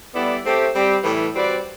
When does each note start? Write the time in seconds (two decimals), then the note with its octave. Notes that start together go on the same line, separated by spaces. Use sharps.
0.15 G3 B3 E4 A4 D5
0.45 A3 C4 G4
0.74 G3 C4 G4
1.04 A2 E3 G3
1.33 G3 C4 F#4 B4 D5